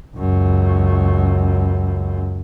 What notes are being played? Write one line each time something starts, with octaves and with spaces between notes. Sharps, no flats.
C#2 F#2